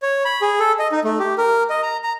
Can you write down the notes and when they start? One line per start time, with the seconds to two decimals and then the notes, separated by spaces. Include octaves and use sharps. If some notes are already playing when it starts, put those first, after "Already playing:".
0.02 C#5
0.25 B5
0.42 G#4
0.60 A4
0.79 D#5
0.92 D#4
1.04 A3
1.19 G4
1.38 A#4
1.70 D#5
1.83 A#5
2.04 A#5